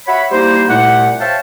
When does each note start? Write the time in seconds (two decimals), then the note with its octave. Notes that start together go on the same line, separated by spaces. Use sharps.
0.07 F#4 C#5 E5 F#5 B5
0.32 G3 A#3 D#4 E4 C5
0.68 C2 A#2 A3 E4 G4 F#5
1.20 C5 C#5 E5 F5 G5 A5